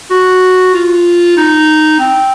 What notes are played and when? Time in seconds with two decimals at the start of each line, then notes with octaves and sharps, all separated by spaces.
0.11 F#4
0.74 F4
1.37 D#4
1.99 C4